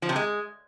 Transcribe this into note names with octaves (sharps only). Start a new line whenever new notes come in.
F3
C3
G#3